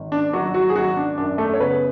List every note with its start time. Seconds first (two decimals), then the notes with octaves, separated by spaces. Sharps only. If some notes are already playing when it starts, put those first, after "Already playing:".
Already playing: G#1
0.12 D4
0.33 G#1 F#3 F#4
0.54 F#3 F#4
0.69 G#4
0.75 G#1 F#3 F#4
0.97 D4
1.18 F#2 D4
1.38 A3 A4
1.53 C#5
1.60 C#3 B3 B4